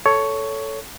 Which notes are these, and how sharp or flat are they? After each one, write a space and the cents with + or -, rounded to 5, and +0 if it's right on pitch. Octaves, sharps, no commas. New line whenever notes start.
A4 +0 C#5 +10